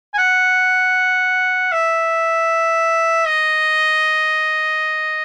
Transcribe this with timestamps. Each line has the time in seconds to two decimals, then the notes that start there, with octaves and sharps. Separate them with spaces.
0.14 G#5
0.18 F#5
1.72 E5
3.26 D#5